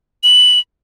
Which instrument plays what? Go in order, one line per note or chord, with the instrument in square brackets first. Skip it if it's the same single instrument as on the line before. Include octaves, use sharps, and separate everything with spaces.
[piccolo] F#7